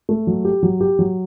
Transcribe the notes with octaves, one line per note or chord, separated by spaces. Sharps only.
A3
F#3
G4
F#3
G4
F#3